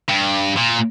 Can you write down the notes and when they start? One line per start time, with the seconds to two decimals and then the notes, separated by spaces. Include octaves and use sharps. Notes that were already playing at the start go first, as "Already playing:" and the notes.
0.09 G2
0.57 A#2